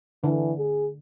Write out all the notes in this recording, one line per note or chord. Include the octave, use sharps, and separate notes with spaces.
D3 E3
G#4